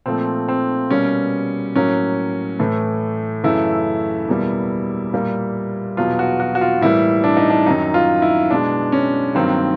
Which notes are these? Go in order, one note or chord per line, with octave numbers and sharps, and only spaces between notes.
A#2 F3 A3 C4
C4
B2 G3 A#3 C#4
A2 F#3 A#3 C#4
A2 E3 A3
F#2 C#3 E3 A3 E4
E2 B2 G3 A#3
A#2 G3 A#3
E2 B2 F#3 F4
F#4
F#4
F#4
F4
A2 E3 G3 A#3 E4
D4
D#4
D4
F#2 D#3 F#3 D#4
F4
E4
B2 G#3 D4
C#4
G2 D#3 F#3 A#3 C4